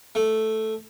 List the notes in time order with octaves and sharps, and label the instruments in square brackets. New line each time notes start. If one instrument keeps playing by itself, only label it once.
[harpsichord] A3